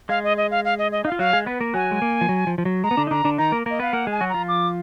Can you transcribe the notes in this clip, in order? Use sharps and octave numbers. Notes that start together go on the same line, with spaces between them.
G#3 G#4 F5
D#5
D#5
F5
F5
D#5
D#5
D#4 F5
F4
F#3 F#4 F5
G#3 G#4
B3 B4
A#3 A#4
F#3 F#4 G#5
G#3
A#3
F3
F#3
F3
F3
F#3
G#3 A#5
B3
D3 D4
D#4
D3 D4 A#5
D3 D4
D#3 D#4 A#5
A#3 A#4
A#3 A#4 D#5
B3 B4 F5
A#3 A#4 F#5
G#3 G#4 G#5
F#3 F#4
F3 F4 A#5
D6